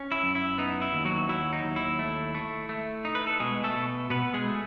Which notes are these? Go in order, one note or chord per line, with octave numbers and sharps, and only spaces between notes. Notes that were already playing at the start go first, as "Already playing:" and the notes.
Already playing: C#4
E4
F#2
E4
B3 D#4
E4
D#2
F#3 F#4
F#3 E4
D#4
D#2
E4
A3
A3
A3
D#4
B4
A4
B2 G#3 G#4
A3 A4
B2
B2 B3 B4
G#3 G#4
A3